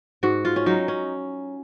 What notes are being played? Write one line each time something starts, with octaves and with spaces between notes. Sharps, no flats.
G#2 F#4
F4
C#4
F#3 D#4
C#4